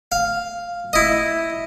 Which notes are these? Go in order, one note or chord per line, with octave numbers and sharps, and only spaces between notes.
F5
E4 D#5